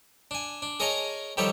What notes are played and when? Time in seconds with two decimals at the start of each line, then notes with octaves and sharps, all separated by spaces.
0.31 D4 G#5
0.62 D4
0.80 G#4 A#4 C#5 D#5 G#5 A5
1.37 D#3 F3 G3 G4 A4 C#5